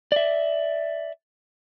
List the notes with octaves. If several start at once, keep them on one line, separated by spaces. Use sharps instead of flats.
D5 E5